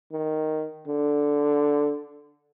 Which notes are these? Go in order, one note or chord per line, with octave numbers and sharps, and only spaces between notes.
D#3
D3